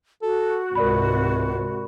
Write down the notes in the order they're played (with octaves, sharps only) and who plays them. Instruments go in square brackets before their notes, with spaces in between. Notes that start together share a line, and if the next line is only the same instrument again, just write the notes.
[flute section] F#4 [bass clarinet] A4
[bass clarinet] C#2 [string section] G#2 C3 [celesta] A#4 D5 B5